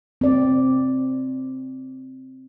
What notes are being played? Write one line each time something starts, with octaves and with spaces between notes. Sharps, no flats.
C4 D5